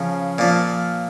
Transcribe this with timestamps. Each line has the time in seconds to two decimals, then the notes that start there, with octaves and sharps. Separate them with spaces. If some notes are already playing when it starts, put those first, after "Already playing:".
Already playing: C#3 F3
0.38 A#2 F3